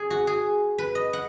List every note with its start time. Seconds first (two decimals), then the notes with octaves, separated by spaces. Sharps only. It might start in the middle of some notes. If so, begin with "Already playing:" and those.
Already playing: G#4
0.10 F#4
0.27 G#4
0.78 B4
0.95 D#5
1.13 F#5